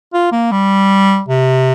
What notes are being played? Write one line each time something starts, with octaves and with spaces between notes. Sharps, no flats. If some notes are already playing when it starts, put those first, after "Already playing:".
F4
A#3
G3
C3